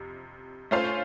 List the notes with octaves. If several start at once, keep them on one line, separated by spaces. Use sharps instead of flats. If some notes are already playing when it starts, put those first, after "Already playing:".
Already playing: F2 C3
A3 C#4 F4 C5 F5